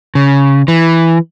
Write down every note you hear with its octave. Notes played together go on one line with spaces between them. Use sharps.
C#3
E3